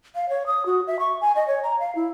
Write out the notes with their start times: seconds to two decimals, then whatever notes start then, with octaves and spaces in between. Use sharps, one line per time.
0.15 F5
0.29 C#5
0.47 D#6
0.66 F#4
0.87 E5
1.00 C#6
1.21 G#5
1.36 D#5
1.47 C#5
1.63 A#5
1.80 F5
1.95 E4